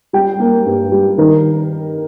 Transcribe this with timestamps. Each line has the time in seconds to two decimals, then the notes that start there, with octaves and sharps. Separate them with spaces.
0.13 G3 G5
0.40 A#3
0.66 G2
0.92 G3
1.18 D#3 A#4